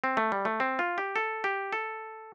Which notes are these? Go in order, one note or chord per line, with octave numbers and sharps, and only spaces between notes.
C4
A3
G3
A3
C4
F4
G4
A4
G4
A4